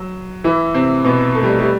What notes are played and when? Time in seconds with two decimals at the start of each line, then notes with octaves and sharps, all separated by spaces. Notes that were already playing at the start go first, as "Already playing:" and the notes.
Already playing: F#3
0.44 E3 E4
0.74 C3 C4
1.05 B2 B3
1.35 A3
1.43 G3
1.59 G3